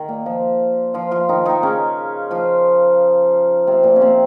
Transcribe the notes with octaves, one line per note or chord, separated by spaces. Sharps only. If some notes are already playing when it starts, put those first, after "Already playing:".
Already playing: D#3
A#2 A#3
F3 F4
F3 F4
F3 F4
D#3 D#4
D#3 D#4
C#3 C#4
F3 F4
C3 C4
A#2 A#3
C#4
C3 C4